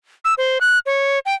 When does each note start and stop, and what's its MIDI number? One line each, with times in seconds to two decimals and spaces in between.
0.25 0.34 88
0.38 0.58 72
0.61 0.79 90
0.86 1.19 73
1.26 1.34 79